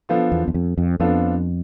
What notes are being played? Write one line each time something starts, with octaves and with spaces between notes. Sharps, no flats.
F3 B3 D4 F4 A4
E2
E2
F2
F2
F2 F3 B3 D4 F4 A4